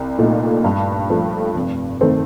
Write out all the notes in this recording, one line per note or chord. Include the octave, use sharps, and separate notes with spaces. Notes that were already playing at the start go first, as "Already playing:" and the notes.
Already playing: C2
A#2 A3 D#4
G2
F3 A3
F1
D#3 A3 C4